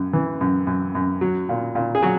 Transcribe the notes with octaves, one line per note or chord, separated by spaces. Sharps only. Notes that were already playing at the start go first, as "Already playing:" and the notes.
Already playing: F#2
E3
F#2
F#2
F#2
F#3
A#2
A#2
G#4
F#3 F#4